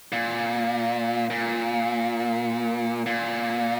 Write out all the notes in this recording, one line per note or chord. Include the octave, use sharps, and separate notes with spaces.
A#2
A#2
A#2